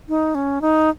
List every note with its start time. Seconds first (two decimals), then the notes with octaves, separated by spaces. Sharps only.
0.09 D#4
0.35 C#4
0.61 D#4